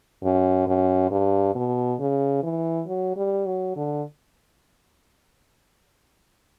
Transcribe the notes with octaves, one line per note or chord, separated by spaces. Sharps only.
F#2
F#2
G2
B2
C#3
E3
F#3
G3
F#3
D3